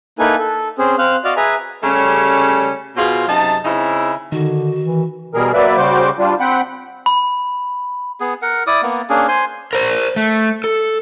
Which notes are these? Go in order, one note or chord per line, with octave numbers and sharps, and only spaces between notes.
A#3 D#4 E4 A4 B4 G#5
A4
C4 C#4 G#4 C5
C4 C5 F5 F6 F#6
F#4 D5 D#5 F5 F6
G#4 B4 E5 G#5 A#5
C#3 G3 A3 C#4 G4
B2 B3 F4 G#4 C5
F#2 C3 D#4 A5
C#3 C4 D#4 E4
D3 D#3 F#4
E3
B2 G3 G#4 A#4
F#3 A#3 B4 D5 E5
C#3 G3 F#4 C5 D6 G6
G3 D4 F4
C4 F#5 G5 B5
B5
B3 G#4
A#4 F#5
E4 D5 D6 D#6
A#3 B3
A#3 C#4 D4 G#4
C5 G#5 C6
A#4 C5
A3
A4